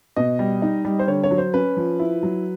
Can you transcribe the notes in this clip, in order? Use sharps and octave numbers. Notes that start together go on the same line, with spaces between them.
B2 D#5
G3
D#4
G3
C5
D3 C#5
C#5
F#3
C5
C#4 B4
F3
E4
F#3